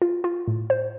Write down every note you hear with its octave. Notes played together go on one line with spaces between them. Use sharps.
F4
F4
A2
C5